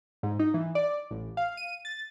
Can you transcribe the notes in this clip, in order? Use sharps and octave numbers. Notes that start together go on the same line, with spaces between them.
G#2
D#4
E3
D5
A1
F5
D#7
A6